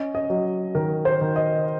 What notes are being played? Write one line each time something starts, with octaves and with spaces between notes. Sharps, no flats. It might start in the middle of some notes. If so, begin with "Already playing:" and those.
Already playing: C#4 D#5
D#5
F#3
D#3 A#4
C5
D#3
D#5